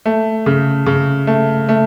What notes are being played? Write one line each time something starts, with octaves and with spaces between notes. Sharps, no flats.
A3
C#3
C#3
A3
A3